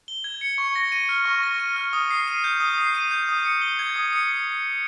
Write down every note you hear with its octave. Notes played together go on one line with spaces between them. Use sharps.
G7
G#6
C#7
C#6
A#6
D#7
F6
C#6
A#6
D#7
F6
D#6
C7
D#7
G6
D#6
C7
D#7
G6
D#6
C#7
G7
G#6
D#6
C#7